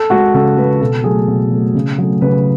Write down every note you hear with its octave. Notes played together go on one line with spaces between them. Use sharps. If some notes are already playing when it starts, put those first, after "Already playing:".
Already playing: A4
G#3 F#4
C#3 A4
G#3 B4
B2 A4
F#3 A3 G#4
B2
F#3 A3
C#3
F#3 A3
C#3 B4